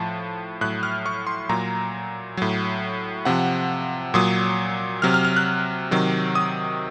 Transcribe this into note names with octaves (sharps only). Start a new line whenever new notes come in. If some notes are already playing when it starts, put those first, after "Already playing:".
Already playing: A2 F3 A5
A2 F#3 F#6
F6
C#6
C6
A#2 F#3 A#5
A2 F#3
C3 F3 F#5
A#2 F#3 D#6
C3 F#3 F6
F6
F6
F#6
C3 D#3 F#3
D#6